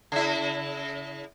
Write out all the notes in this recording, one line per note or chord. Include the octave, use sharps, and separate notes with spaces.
C#3 E4